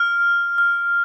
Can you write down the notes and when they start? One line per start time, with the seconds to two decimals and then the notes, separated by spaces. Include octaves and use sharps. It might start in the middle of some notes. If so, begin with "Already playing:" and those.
Already playing: F6
0.58 F6